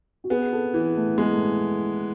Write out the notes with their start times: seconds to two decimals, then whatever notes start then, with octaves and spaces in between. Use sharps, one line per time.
0.24 F#4
0.30 B3 G#4
0.53 A4
0.74 E3 G#4
0.96 A3
1.18 G#3 B3
1.32 A3